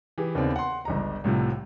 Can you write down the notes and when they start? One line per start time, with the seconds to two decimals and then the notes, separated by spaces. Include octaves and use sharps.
0.18 E3 G4 G#4
0.35 D#2 C#3 B3 C4 D4
0.56 F#5 C6
0.85 G1 C#2 A#5
1.24 C2 A2 C3 F3